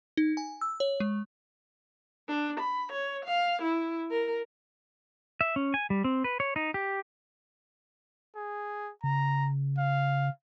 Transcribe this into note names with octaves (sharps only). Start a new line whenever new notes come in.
D#4
G#5
E6
C#5
G#3
D4
B5
C#5
F5
E4
A#4
E5
C#4
G#5
G3
C4
B4
C#5
D#4
G4
G#4
C#3 A#5
F5